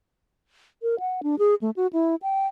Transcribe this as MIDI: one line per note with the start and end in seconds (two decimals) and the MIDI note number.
0.82 0.99 70
1.00 1.21 78
1.23 1.35 62
1.39 1.55 68
1.61 1.70 57
1.76 1.87 66
1.93 2.15 64
2.22 2.47 79